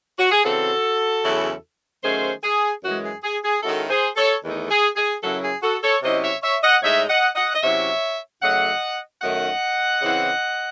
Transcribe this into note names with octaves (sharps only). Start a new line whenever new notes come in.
F#4
G#4
C#3 E3 C4 F#4 A4
E2 C#3 F#3 C#4 E4
D#3 F#3 A3 C#4 G#4 C5
G#4
F#2 E3 G#3 F#4
G#4
G#4
G#4
D#3 G#3 C#4 E4 F#4 A4
G#4 C5
A4 C#5
E2 D#3 A3 D#4
G#4
G#4
F#2 C#3 F#3 C#4 E4 F#4 A4
G#4
F#4 A4
A4 C#5
C3 F#3 C#4 E4 C5 D#5
C#5 E5
C#5 E5
D#5 F#5
A2 G#3 D#4 C#5 E5
D#5 F#5
D#5 F#5
D#5
C3 F#3 C#4 E4 C#5 E5
C#3 F#3 A3 D#5 F#5
F#2 D#3 A3 D#4 D#5 F#5
C#3 E3 C4 E4